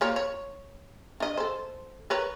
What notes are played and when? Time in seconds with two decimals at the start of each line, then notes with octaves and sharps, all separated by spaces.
0.01 F3 A#3 C#5
0.16 C#5
1.20 D4 D#5
1.37 A4 C5
2.10 A#4 B4 C#5